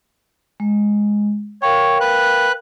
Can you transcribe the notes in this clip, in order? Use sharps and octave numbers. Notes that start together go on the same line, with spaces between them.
G#3
A#4 C#5 F5 G5
B4 F#6